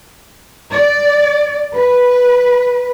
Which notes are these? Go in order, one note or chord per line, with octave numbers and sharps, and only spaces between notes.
D5
B4